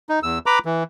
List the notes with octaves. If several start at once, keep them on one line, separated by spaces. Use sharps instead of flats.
D#4
E2 E6
B4 A#5 B5 D6
E3